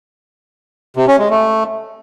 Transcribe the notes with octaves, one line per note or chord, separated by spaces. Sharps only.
C3
C#4
G#3
A3